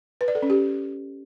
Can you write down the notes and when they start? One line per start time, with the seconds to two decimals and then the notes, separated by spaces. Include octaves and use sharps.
0.21 B4
0.28 D5
0.35 A4
0.42 C#4
0.50 G4